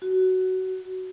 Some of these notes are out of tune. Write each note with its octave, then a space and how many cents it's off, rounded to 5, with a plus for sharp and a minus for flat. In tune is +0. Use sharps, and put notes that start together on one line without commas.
F#4 +15